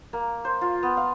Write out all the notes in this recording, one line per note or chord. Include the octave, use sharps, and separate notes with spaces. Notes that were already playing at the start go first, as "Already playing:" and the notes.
A#3
C5
F4
B3
F5